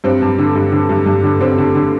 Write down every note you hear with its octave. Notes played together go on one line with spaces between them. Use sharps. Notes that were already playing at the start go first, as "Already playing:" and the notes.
G2 C4
G2
D3
G2
D3
G2
G2
D3
D3 C4
D3
D3